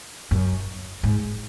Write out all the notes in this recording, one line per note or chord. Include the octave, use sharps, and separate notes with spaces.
F#2
G#2